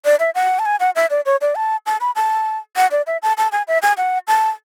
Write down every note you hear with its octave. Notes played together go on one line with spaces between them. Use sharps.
D5
E5
F#5
A5
G#5
F#5
E5
D5
C#5
D5
A5
A5
B5
A5
F#5
D5
E5
A5
A5
G#5
E5
G#5
F#5
A5